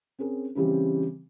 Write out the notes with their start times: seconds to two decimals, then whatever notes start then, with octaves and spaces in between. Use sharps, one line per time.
0.19 C4 C#4 G#4 A#4
0.55 C#3 E3 G3 C4 G4